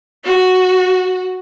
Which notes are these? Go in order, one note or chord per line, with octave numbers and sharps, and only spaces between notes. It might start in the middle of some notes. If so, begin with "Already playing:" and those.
F#4